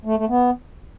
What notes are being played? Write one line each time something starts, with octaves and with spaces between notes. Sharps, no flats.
A3
A3
B3